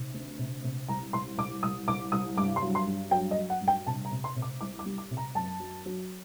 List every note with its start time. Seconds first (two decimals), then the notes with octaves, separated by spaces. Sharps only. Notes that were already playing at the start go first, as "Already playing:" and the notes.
Already playing: C3 D#3
0.14 D2
0.39 C3
0.64 C3
0.88 C2 A#5
1.13 C2 C6
1.37 C2 D6
1.63 C2 D#6
1.88 C2 D6
2.12 C2 D#6
2.37 G2 D6
2.56 C6
2.62 F#3
2.75 C6
2.87 G2
3.11 F#3 G5
3.31 D#5
3.36 F#3
3.50 F#5
3.61 G2
3.68 G5
3.86 C3 A5
4.05 A#5
4.11 C3
4.24 C6
4.36 C3
4.42 D6
4.61 C2 D6
4.79 D6
4.86 G3
4.98 D6
5.11 C3
5.17 A#5
5.35 F#2 A5
5.60 F#3
5.86 F#3